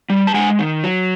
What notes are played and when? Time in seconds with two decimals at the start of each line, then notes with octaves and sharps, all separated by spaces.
0.10 G3
0.27 A5
0.34 G#3 F#5 G#5
0.59 D#3
0.84 F#3